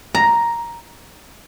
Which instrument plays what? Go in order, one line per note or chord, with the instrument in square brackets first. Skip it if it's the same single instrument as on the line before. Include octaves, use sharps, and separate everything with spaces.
[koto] A#5